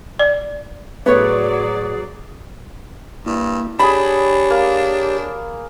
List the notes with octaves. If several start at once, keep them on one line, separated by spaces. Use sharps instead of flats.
D5
A2 F#3 B3 G#4 C#5 D5
G2 A#3 E4
D4 G4 G#4 C#5 B5
A#3